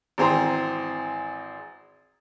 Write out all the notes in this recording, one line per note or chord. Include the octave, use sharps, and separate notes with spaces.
G#1 E3 C4 G#4 A#5 C6